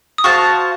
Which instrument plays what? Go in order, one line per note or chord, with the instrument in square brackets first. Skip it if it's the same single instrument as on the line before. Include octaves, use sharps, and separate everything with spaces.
[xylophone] D#6
[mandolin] F#4 C5 F5 A5 [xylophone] C#6